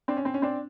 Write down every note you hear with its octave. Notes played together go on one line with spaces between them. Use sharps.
C4 D4
C#4
C4
C#4
C4 D4